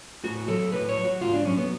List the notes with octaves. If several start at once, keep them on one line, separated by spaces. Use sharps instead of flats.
A2 F#4
F#3 A4
A2 B4
C#5
F#3
F#4
G#2 F4
D4
F#3 C#4
B3